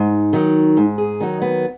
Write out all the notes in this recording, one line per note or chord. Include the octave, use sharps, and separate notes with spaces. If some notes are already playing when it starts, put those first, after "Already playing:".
Already playing: G#2 D#4
D#3 F#3
G#2
G#4
D#3 F#3 D#4
B3